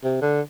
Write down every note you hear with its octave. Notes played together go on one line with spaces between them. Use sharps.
C3
D3